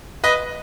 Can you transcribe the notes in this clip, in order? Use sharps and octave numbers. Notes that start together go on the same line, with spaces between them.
B4 D#5